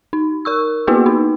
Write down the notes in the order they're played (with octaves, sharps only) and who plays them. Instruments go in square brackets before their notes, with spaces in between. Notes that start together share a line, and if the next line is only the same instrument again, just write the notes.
[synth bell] D#4
A#4 C#6 E6
A#3 B3 E4 F#4 G#4 B4
D#4